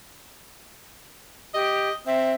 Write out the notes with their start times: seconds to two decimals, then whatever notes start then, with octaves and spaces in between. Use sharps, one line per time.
1.54 G4 D#5
2.07 C4 E5